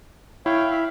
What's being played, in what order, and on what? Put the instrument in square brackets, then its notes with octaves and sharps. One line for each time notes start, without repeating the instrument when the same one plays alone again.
[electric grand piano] E4 [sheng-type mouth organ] C#5 F5 G5
[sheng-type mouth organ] E5 F5 B5